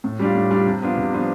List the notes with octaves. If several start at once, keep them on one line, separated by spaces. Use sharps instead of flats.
A2
G3 D4 F4
A2
G3 D4 F4
C3
F3 B3 D4 F4
C3
F3 B3 D4 F4